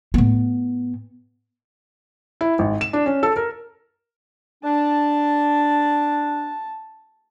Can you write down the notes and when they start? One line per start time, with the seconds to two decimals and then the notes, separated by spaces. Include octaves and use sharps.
0.14 A2 B3
2.41 E4
2.59 G#1
2.81 E7
2.93 D4
3.06 C#4
3.23 A4
3.36 A#4
4.64 D4 A5